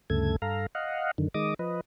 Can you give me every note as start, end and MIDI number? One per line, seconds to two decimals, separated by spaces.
0.10 0.36 38
0.10 0.36 43
0.10 0.36 49
0.10 0.36 57
0.10 0.36 69
0.10 0.36 92
0.42 0.66 43
0.42 0.66 69
0.42 0.66 77
0.42 0.66 82
0.75 1.11 75
0.75 1.11 77
0.75 1.11 78
1.18 1.28 42
1.18 1.28 50
1.18 1.28 51
1.34 1.54 51
1.34 1.54 56
1.34 1.54 75
1.34 1.54 86
1.34 1.54 87
1.59 1.81 53
1.59 1.81 71
1.59 1.81 75